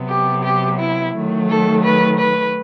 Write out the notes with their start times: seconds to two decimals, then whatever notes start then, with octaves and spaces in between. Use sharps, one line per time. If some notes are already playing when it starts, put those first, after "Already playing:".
Already playing: C3 F#3 B3
0.10 G4
0.44 G4
0.80 E4
1.15 D#3 F#3 A3
1.50 A4
1.85 B4
2.20 B4